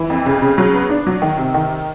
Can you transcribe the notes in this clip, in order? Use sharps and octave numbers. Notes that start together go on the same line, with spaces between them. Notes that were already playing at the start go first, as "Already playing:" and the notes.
Already playing: E3
F2
C#3
C#3
F#3
B3
D4
F#3
D#3
C3
D#3